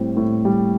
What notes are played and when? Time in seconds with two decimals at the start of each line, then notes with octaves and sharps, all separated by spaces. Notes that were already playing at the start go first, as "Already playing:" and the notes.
Already playing: A2 G3 C4
0.17 A2
0.45 G3